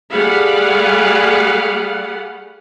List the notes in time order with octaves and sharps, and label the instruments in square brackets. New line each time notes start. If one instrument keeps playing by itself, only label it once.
[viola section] G3 A3 G#4 F5 F#5 B5